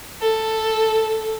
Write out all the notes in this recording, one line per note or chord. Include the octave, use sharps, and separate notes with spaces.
A4